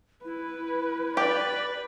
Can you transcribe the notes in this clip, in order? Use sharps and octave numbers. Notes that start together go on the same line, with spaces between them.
E4 B4
G4 B4 D5